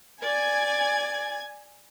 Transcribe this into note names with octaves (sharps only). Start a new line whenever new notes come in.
D5 G#5 G#6